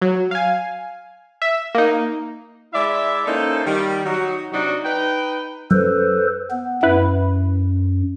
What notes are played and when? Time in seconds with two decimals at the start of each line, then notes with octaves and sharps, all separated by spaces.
0.02 F#3
0.31 F5 G#5
1.42 E5
1.75 A#3 D#4
2.73 G#3 E4 D5 E5
3.26 A#3 C#4 D#4 E4 A4 C5
3.66 D#3 G3
4.05 F#3 D#4 F#4
4.51 C3 F#3 D4 D#4 F#4
4.85 D#4 B4 G5
5.71 F#2 A4 B4 C5
6.50 B3
6.83 F#2 E4 B4